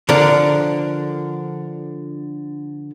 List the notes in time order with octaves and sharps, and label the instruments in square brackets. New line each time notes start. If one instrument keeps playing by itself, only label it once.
[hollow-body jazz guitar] D3 F3 D4 A#4